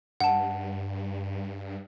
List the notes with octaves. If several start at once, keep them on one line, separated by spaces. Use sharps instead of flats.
G2 F#5 A5